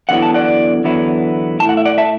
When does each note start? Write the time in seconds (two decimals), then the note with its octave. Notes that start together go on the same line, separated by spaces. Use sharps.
0.09 E2 D3 F#3 B3 E4 F#5
0.22 A5
0.34 D5 F#5
0.84 E2 D3 F#3 B3 E4
1.60 A2 A3 E4 A5
1.69 F#5
1.77 E5
1.85 D5 F#5
1.98 E5 A5